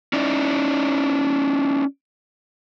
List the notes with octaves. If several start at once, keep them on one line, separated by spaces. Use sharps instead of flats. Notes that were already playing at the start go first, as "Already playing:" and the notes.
C#4 D#4 E4 D5